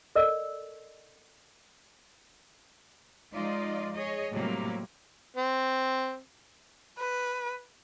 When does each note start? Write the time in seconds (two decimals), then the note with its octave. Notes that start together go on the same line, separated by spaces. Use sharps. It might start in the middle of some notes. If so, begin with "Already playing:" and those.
0.16 A4 A#4 D5 D#5 E6
3.33 F3 G#3 D#4 F4 D5 D#5
3.94 G#4 C#5 D#5
4.30 A2 C3 F#3 G3 A3 A#3
5.37 C4
6.98 B4